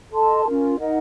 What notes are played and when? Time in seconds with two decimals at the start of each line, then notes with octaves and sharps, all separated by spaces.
0.11 A4 D#5 A5 C6
0.44 C#4 F4 A#4
0.79 D#4 A#4 D#5 F#5